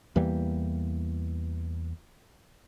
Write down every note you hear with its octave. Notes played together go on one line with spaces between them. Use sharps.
E2 E3 G3 A#3